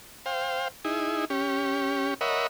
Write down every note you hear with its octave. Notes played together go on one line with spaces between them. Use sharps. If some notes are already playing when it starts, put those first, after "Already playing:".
C5 F5 G5
D#4 E4 G#4
C#4 G4
A#4 C#5 D#5 E5 F#5 B5